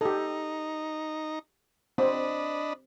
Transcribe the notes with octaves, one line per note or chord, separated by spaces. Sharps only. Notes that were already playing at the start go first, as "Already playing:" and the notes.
D#4 G4 A4 A#5
C4 D4 D#5 B5